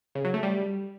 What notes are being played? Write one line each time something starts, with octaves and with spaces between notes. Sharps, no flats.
C#3
F#3
A3
G3